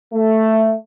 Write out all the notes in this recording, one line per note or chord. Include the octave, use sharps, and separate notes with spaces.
A3